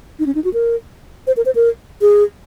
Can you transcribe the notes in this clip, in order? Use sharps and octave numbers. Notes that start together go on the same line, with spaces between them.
D#4
C#4
D#4
F#4
A#4
C5
A#4
C5
A#4
G#4